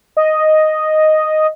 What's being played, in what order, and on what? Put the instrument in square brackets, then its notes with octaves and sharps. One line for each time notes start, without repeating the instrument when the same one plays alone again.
[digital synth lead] D#5